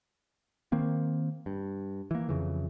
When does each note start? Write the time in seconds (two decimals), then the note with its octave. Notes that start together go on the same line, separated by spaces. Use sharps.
0.72 D#3 A#3 C4
1.46 G2
2.11 E3 A#3
2.29 F2 C#3 E3